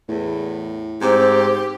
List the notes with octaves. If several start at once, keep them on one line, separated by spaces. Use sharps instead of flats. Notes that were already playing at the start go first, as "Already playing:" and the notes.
E2 A2
G#2 C4 G4